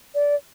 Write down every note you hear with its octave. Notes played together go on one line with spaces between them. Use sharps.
D5